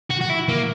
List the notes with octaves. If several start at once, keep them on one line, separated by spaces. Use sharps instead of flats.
F#4
F#4
E4
A#3